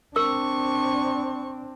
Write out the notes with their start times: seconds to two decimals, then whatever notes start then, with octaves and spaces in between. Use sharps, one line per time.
0.16 C4 D4 A#4 C#6 E6